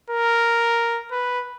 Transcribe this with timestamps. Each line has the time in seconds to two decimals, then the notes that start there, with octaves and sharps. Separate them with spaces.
0.10 A#4
1.11 B4